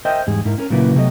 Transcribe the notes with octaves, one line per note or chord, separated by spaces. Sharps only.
A#4 C5 D#5 E5 G5
E2 G#2 G3 G#4
G#2 E4 A#4
C#4 A#4
A#2 C#3 F#3 A#3 E4 B4
C3 F#3 A3 B3 D#5